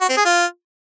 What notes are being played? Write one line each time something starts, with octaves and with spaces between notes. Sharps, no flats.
F#4
C4
G#4
F4